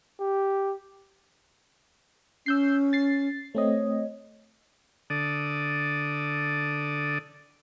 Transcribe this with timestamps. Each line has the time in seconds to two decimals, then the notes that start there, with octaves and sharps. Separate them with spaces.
0.20 G4
2.46 C#4 E6 G6 C7
2.93 A6 C7
3.55 A3 C4 C#5 D#5
5.10 D3 A4 D5 D#6